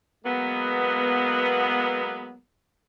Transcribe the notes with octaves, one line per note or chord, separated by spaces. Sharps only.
F#3 G#3 A#3 B3